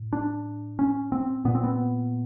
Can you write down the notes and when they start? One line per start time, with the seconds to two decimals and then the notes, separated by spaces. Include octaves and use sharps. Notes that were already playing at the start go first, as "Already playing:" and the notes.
Already playing: A2
0.13 D4
0.79 C#4
1.12 C4
1.45 A#2 B3
1.55 C4
1.64 B3